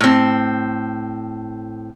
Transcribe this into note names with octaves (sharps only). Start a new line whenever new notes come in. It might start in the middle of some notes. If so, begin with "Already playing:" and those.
A2 C4